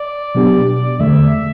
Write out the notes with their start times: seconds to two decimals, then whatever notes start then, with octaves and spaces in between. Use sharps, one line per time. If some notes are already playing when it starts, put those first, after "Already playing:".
Already playing: D5
0.35 B2 F#3 B3 D4 G4
0.99 E2 D3 A3 E5